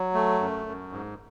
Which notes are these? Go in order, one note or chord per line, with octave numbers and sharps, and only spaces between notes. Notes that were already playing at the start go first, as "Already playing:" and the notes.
Already playing: F#3
A3
F#2
F#2
G#2